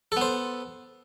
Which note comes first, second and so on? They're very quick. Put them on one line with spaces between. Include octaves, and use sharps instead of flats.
A4 B3 C5